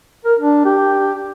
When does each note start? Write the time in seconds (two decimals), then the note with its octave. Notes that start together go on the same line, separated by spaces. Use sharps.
0.25 A#4
0.39 D4
0.65 G4